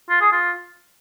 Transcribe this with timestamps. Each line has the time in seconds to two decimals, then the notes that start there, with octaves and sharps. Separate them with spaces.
0.10 F4
0.21 G#4
0.32 F4